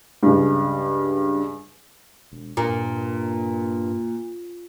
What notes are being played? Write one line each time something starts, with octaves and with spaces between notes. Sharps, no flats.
C#2 G2
E1
G2 A#2